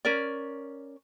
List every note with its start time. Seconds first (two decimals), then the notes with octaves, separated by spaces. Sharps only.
0.05 C#4 A#4 D5